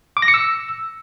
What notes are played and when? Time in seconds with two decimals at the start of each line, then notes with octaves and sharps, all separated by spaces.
0.17 D6
0.22 A#6
0.28 C#7
0.34 E6